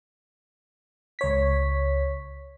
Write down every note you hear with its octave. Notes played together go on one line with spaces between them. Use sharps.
C#2 C#5 B6